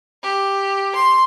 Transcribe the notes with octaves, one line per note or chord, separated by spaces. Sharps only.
G4
C6